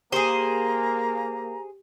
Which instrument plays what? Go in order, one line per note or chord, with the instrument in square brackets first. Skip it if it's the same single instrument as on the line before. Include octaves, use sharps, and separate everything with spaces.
[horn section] A#3 [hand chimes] G4 [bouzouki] G#4 C5 [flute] A#5